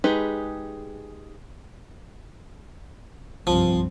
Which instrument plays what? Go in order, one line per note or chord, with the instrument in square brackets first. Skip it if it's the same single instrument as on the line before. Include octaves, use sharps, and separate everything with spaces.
[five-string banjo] G#3 D#4 G4 G#4 B4
[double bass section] C2 G2 C4 [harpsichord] F3